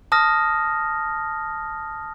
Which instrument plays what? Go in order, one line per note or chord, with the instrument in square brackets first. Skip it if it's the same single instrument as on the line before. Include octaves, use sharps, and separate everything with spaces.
[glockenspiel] A5 D#6 F6 A#6